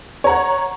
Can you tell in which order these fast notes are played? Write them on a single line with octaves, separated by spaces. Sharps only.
C#5 A#5 F#5